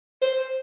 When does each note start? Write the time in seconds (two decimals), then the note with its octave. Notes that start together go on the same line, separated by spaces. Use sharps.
0.22 C5